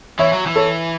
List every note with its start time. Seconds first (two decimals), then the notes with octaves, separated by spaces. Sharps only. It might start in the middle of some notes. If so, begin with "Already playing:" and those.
0.19 E3 C#5 E5
0.33 F#3
0.46 E3
0.56 A4 C#5